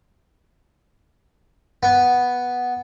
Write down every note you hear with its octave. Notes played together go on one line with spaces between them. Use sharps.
B3